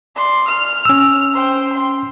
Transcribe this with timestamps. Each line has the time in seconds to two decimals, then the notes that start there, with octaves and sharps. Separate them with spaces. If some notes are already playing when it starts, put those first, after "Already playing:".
0.16 D5 C6
0.48 F6
0.85 C#4 E6
1.33 C5 G5
1.73 G5 C6